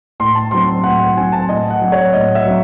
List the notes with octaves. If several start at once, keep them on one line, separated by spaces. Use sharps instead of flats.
A2 C6
A5
F#3 C4 C6
A2 F#5
F#5
F#3 C4 G#5
A5
A2 D#5
F#5
F#3 C4
C#5
A2 D#5
E5
F#3 C4